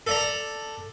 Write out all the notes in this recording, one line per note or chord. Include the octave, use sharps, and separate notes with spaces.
A4 D5 A#5